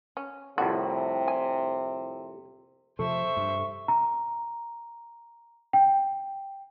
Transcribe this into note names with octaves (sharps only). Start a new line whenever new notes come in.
C#4
C2 F2 A2 C3 F#4
G#5
C3 F3 A4 C5 E5 C#6
G2
A#5
G5